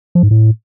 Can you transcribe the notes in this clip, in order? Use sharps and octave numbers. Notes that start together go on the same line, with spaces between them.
F3
G#2
A2